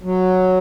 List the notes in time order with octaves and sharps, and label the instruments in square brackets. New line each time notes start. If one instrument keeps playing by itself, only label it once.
[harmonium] F#3